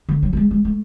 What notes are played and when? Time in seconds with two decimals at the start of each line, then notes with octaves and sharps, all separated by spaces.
0.09 D3
0.23 F#3
0.33 F#3
0.37 G#3
0.51 G#3
0.65 A3